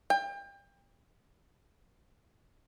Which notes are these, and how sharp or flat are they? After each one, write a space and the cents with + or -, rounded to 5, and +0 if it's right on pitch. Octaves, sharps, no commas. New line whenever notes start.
G5 +30